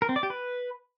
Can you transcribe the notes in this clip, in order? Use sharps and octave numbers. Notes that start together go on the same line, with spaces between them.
A#4
C4
D5
G4
B4